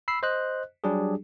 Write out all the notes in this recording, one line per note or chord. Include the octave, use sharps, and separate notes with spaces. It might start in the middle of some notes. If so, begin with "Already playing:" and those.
B5 E6 C7
C5 D#5 F#6
F#3 G3 D4 G4 G#4